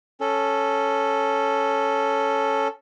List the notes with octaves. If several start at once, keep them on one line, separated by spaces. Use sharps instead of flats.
C#4 A4